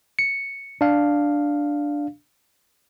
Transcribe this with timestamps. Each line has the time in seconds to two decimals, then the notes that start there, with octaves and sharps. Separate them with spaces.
0.19 C#7
0.81 D4 F5